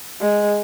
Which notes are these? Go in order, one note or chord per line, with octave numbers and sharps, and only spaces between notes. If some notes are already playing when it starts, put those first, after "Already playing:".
G#3